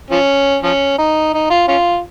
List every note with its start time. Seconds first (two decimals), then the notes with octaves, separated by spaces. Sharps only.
0.11 F3 C#4
0.63 F3 C#4
0.98 D#4
1.34 D#4
1.50 F4
1.68 C#4 F4